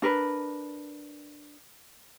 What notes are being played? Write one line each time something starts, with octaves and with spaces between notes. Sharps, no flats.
D4 A#4 B4